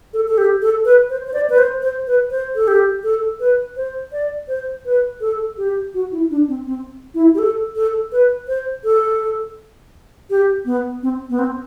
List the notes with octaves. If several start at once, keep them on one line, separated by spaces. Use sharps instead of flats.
A4
A4
G4
A4
B4
C5
C5
D5
B4
C5
C5
B4
C5
A4
G4
A4
B4
C5
D5
C5
B4
A4
G4
F#4
E4
D4
C4
C4
E4
G4
A4
A4
B4
C5
A4
G4
B3
C4
B3
C4